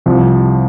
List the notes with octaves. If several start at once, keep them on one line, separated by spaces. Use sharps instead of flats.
C2 C3 F3